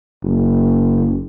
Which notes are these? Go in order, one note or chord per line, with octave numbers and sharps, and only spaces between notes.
F#1